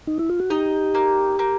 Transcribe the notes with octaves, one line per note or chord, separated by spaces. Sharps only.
D#4
E4
F4
F#4
D#4 G4
A#3
A#3